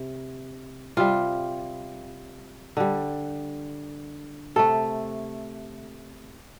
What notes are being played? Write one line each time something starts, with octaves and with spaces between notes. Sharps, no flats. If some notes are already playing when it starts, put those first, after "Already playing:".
Already playing: C3
C3 G3 F4
D3 G3
C3 A3 A4